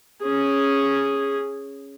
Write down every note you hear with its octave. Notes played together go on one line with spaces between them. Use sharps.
C#4 G#4